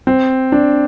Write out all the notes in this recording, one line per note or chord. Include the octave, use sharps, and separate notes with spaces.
C4
D4